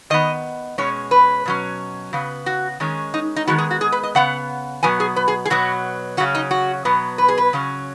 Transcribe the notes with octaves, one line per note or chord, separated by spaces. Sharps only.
D#3 B3 D#5
B2 G#3 C#4 C#5
B4
B2 F#3 C#4
C#3 B3
F#4
D#3 G#3 C#4
D#4
D#4
D#3 G#3 B3 F#4
G#4
F#4
G#4
B4
D#5
C#3 B3 F#5
B2 F#3 B3 G#5
G#4
B4
G#4
G#4
B2 F#3 B3 F#4
C#3 F#3 C#4 F#4
D#4
F#4
B2 F#3 B3
B4
G#4
B4
C#3 F#3 C#4